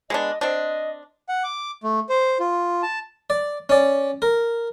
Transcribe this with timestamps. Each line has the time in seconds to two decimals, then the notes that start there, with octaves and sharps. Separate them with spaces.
0.10 G#3 B3 D4 D#5
0.41 C4 D4 D#5
1.29 F#5
1.44 D6
1.84 A3
2.09 C5
2.40 F4
2.83 A5
3.30 D5
3.69 C#4 D5
4.22 A#4